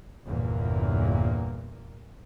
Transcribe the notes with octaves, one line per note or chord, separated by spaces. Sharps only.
G1 E2 A#2 A#3